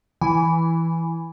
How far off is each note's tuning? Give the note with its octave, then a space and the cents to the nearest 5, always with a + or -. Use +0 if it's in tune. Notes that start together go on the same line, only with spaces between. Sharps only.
E3 +0 G#5 +0